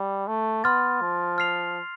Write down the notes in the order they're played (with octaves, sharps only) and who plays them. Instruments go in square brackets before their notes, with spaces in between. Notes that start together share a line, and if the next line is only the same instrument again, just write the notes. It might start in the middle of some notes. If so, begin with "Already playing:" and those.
Already playing: [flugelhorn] G3
A3
[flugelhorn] B3 [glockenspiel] C6 F6 A6
[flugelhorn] F3
[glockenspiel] F6 C7 F7